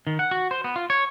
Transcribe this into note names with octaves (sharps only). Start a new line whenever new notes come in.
D#3
F#5
F#4
C5
B3
F4
C#5